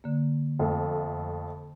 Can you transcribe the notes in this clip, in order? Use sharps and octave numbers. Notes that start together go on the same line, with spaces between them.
D3 A#3
F2 A3